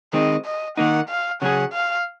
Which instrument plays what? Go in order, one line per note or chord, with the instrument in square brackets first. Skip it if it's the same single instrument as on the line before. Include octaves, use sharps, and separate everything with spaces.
[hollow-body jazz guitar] D#3 G#3 C4 [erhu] D#5
[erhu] D#5
[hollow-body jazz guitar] D#3 A#3 D#4 [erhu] F#5
[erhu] F5
[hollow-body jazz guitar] C#3 F#3 C#4 G#4 [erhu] F#5
[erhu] F5